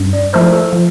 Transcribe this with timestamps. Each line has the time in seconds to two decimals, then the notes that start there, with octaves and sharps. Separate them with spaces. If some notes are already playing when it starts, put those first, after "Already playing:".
Already playing: G2
0.13 D5
0.33 F3 A3 E4 A#4 C5
0.53 A4
0.73 F3